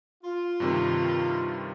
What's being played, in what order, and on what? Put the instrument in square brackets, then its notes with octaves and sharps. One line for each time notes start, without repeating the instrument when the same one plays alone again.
[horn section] F4
[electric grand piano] G2 C3 D#3